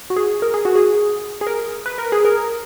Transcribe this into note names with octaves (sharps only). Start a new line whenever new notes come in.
F#4
G#4
A#4
G#4
F#4
G#4
G#4
A#4
B4
A#4
G#4
A#4